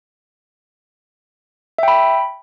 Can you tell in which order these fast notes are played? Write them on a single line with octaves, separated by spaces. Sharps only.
E5 G5 B5